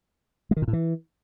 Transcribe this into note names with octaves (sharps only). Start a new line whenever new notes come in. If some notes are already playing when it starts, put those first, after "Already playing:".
G#3
D#3
A#2
A2
E3